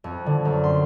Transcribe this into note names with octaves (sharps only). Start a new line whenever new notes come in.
F2
D3
F#2
C6